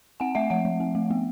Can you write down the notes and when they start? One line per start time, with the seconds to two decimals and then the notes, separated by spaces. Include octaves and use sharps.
0.20 C4 F#5 G#5
0.35 A3 E5 F#5
0.50 F3 E5 F#5
0.65 F3
0.80 C4
0.95 A3
1.10 B3